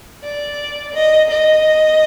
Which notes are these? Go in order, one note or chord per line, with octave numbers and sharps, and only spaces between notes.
D5
D#5
D#5